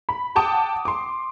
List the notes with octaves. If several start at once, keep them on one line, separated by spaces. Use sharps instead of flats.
B5
F#5 G5 A5 D6 D#6
C6 D6